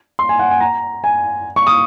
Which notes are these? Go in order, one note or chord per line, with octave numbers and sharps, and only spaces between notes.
C6
G#5
F#5
G#5
A#5
G#5
C#6
D#6